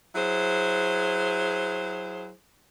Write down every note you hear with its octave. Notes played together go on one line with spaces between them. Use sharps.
F#3 E4 G#4 C5